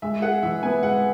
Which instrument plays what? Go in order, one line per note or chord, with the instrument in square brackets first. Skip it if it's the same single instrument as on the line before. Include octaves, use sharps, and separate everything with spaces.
[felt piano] G#3 [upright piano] E5
[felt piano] G#4 [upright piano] F#5
[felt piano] E3 [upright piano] E5
[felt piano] B3 [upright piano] G#5
[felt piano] G#3 [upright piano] F#5